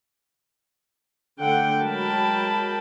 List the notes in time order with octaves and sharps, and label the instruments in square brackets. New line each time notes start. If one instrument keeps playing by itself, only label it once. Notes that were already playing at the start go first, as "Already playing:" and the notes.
[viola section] D3 A3 F#5 G5
F#3 G#3 A#4 G5 A5 B5